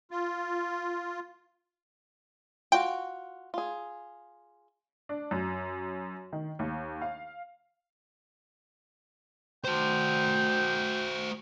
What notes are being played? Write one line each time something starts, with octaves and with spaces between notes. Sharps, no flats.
F4
F4 F#4 G5
F4 G#4
D4
F#2
D#3
D#2
F5
F#4 C5 G5